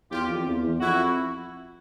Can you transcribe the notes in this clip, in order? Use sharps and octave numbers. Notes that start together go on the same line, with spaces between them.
E2 F4 G4
F2
E2
E2
F2 E4 F#4